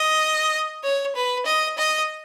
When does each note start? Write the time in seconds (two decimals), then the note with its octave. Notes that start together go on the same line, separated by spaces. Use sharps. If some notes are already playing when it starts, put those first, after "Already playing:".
Already playing: D#5
0.83 C#5
1.16 B4
1.46 D#5
1.78 D#5